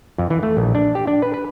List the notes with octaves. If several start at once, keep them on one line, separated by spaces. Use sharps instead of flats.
F2
E3
A3
A#1
D4
G4
D4
B4
B4